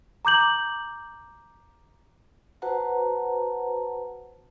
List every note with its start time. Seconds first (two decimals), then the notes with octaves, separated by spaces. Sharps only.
0.25 A#5 D6 G6 F#7
2.62 F#4 B4 C5 F#5 A5 A#5